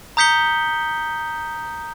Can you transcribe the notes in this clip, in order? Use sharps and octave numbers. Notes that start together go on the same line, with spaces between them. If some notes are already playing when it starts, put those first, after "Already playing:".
A#5 D#6 G6 B6 C#7 G7